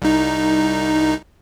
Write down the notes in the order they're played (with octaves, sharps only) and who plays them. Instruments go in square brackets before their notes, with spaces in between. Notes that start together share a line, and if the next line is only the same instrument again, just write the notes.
[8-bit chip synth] C2 D#4